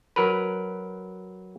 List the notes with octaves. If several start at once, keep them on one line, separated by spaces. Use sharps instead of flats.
F#3 A#4 B4